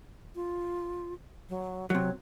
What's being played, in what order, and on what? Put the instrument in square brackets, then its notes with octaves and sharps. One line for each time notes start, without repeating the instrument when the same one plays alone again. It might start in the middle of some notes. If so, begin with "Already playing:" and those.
[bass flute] F4
F#3
[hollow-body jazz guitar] C3 F#3 [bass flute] C#5